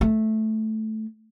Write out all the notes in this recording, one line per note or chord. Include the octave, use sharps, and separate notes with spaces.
A3